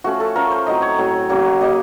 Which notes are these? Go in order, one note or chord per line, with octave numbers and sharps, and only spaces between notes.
F3 A3 C#4 F#4
A4
F3 A3 C#4 A#4
C5
A2 F#3 C4 D#5
C#5
A2 F#3 C4
C#3 F#3 A#3
C#3 F#3 A#3 D#5